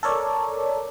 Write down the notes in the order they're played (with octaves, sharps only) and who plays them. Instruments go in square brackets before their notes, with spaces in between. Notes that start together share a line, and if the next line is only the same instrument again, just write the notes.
[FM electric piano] A4 A#4 C#5 D5